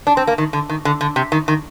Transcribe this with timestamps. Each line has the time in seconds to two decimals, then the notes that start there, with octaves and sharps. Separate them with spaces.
0.07 D4
0.17 C4
0.27 A#3
0.38 D#3
0.53 D3
0.69 D#3
0.85 D3
1.01 D3
1.16 C3
1.32 D#3
1.48 D#3